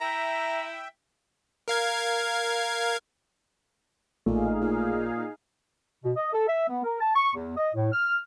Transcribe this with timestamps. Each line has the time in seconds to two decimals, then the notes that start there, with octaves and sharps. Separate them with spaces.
0.01 E4 E5 G5 A#5
1.68 A#4 F5 G#6
4.26 A1 A#2 A3 D#4 G#4 F5
4.61 A#2
6.04 B2
6.16 D#5
6.33 A4
6.48 E5
6.69 B3
6.84 A#4
7.01 A5
7.15 C#6
7.35 E2
7.57 D#5
7.75 A2
7.92 F6